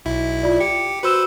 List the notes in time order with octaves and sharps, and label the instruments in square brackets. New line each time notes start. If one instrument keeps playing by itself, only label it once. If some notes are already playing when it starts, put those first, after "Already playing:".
[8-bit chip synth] B1 E4
[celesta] F4 D5
[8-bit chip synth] G4 [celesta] C#7
[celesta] F#4 E6 E7 [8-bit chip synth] B4 C5